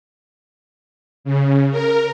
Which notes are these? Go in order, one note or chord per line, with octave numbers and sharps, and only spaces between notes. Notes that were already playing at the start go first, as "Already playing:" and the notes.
C#3
A#4